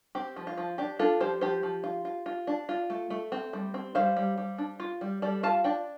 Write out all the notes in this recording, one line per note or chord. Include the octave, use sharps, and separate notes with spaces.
C4 G4
F3
F4
F3
D4 G4
D4 F4 A4
F3 G4 C5
F3 G4 C5
F3
F4
F4
F4
D4
F4
A3
A3
C4
G3
C4
G3 C5 F5
G3
G3
D4
F4
G3
G3 A4 D5
F4 F5 A5
D4 D5 G5